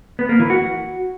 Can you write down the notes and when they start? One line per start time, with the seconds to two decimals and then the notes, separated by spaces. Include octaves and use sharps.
0.19 B3
0.29 A#3
0.39 E3
0.50 F#4